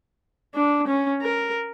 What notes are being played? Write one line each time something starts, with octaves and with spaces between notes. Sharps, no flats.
D4
C#4
A#4